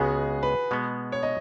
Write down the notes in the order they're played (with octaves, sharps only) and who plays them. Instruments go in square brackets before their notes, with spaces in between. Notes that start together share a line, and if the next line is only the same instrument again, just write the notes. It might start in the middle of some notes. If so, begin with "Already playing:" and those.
Already playing: [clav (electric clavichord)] C#2 C#3 G#3 B3 [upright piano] F#4 G#4
[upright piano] B4
[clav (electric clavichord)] B2 G#3 B3
[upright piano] C#5
D#5